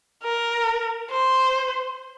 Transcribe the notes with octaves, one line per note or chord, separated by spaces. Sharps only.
A#4
C5